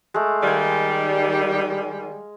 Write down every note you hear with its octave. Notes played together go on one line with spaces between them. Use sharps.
G#3 A3
D#3 G3 F5 G#5